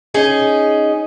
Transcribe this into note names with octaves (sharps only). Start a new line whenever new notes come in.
C#4 D#4 G#4 D#5